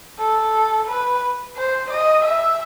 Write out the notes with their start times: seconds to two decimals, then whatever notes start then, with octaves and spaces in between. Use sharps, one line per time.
0.18 A4
0.87 B4
1.57 C5
1.91 D#5
2.25 E5